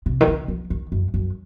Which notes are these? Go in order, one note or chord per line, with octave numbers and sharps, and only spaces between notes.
C3
D#3
C#3
F3
D#3
F#2
F#2